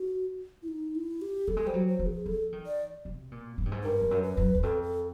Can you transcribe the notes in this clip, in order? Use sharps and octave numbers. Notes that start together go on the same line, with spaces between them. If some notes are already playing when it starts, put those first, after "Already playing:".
Already playing: F#4
E4
D#4
E4
G4
G3 A4
G#3
G3 C5
F#3
C5
F3
G#4
F3 A4
D#3
D5
C3
A#2
G#2
G2
G#2
G2 A#4
F2
F#2
B4
F#2
E2
F2 A4
A4